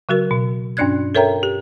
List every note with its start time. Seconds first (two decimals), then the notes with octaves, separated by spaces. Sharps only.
0.09 C#3 F#3 F#4 A#4
0.31 B2
0.77 G2 C#4 D4 D5 F#6 G#6
1.15 A4 A#4 C#5 E5 G5 A#5
1.43 G4